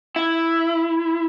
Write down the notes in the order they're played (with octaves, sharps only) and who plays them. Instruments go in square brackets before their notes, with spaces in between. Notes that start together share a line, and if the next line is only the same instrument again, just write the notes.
[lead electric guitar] E4